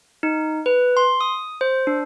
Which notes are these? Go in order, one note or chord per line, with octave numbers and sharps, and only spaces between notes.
D#4
B4
C6
D#6
C5
D4